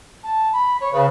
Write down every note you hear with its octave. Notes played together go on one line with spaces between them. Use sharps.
A5
B5
C#5
C#3 B4